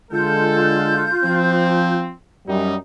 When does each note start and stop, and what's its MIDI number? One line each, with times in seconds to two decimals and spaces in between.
0.11 1.11 50
0.11 1.11 56
0.11 1.95 65
0.11 1.11 69
0.11 1.95 91
1.23 2.12 53
1.23 2.12 60
2.47 2.75 42
2.47 2.75 55
2.47 2.75 63